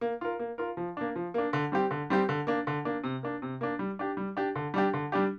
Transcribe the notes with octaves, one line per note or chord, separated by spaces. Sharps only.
A#3
F4 A#4
A#3
F4 A#4
F3
A#3 D4
F3
A#3 D4
D3
G3 C4 G4
D3
G3 C4 G4
D3
A#3 D4
D3
A#3 D4
C3
A#3 D4
C3
A#3 D4
G3
D4 G4
G3
D4 G4
D3
G3 D4 G4
D3
G3 D4 G4